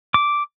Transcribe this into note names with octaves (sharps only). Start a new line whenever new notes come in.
D6